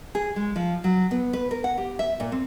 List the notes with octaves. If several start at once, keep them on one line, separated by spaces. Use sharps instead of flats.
G#4
G#3
F3
F#3
B3
B4
A#4
F#5
G4
E5
A#2
C4